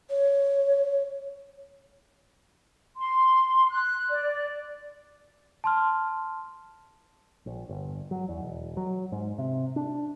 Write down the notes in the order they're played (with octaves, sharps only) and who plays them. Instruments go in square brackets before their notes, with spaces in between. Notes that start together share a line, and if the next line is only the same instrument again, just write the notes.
[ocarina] C#5
[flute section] C6
F#6
D5
[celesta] A5 C6 F6
[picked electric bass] A#1
G1
F#3
E2
E1
F#3
G#2
C3
D4